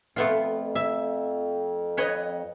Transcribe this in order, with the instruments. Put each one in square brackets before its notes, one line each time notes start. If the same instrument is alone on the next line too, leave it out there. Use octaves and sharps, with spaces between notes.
[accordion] F2 [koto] A3 B3 F4
[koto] E5
B4 C#5 D#5